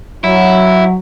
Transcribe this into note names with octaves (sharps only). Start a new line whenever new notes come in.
F#3 E4